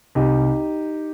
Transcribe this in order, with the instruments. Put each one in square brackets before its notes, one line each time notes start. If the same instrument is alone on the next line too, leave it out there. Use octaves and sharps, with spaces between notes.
[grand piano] C2 D#4 G4